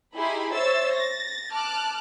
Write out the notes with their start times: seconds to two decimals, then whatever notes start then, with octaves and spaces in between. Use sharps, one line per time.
0.16 D#4 E4 G4 G#4 B5 C6
0.54 C5 C#5 E5 C6 E6 A6
0.94 A6 A#6
1.52 A5 D6 F6 F#6